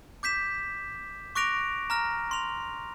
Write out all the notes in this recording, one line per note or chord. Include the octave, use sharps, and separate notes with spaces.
D6 G6 B6 E7
C#6 D6 F#6 A#6 D7 F7
A#5 F6 A#6
C6 F7